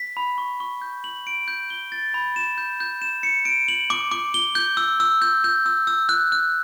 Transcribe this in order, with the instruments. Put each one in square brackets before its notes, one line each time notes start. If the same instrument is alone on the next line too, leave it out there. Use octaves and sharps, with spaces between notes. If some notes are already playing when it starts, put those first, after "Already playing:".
Already playing: [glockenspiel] B6
B5
C#6
C#6
G6
F#7
D7
G6
G7
A6
B5
E7
G6
G6
E7
C#7
D7
F#7
D6
D6
G7
G6
E6
E6
G6
G6
E6
E6
F#6
F#6